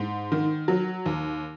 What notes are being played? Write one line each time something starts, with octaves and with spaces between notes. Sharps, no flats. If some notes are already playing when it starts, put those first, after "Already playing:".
Already playing: G#2
D#3
F#3
D#2